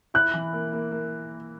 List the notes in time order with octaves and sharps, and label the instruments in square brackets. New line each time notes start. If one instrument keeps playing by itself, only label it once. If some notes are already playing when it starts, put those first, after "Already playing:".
[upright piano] E4 [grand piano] F#6
[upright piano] E3
A#3
A#3
A#3